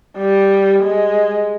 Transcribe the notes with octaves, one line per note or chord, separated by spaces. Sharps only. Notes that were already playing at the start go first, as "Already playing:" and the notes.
G3
G#3